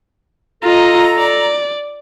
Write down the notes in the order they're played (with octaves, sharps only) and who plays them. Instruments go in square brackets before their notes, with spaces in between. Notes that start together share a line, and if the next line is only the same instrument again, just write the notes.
[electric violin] F4 D#5 [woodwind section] A4 A#5
[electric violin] D5